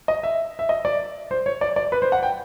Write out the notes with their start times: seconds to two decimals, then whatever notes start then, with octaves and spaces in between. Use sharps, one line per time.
0.08 D#5
0.23 E5
0.59 E5
0.69 D#5
0.85 D5
1.31 C5
1.46 C#5
1.61 D5
1.76 D5
1.92 B4
2.02 C5
2.12 F#5
2.23 G5